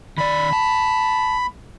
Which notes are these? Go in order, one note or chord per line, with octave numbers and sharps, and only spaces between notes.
D#3 D5 B5
A5